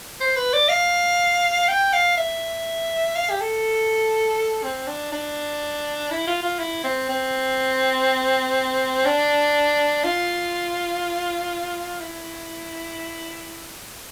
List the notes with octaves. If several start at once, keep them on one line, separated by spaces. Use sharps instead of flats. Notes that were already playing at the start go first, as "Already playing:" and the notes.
C5
B4
D5
F5
G5
F5
E5
F5
G4
A4
C4
D4
D4
E4
F4
F4
E4
C4
C4
D4
F4
E4